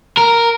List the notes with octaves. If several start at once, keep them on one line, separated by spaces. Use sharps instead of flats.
A#4